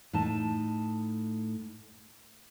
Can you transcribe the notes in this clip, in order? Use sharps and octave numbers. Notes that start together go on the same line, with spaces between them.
A2 D#4 A5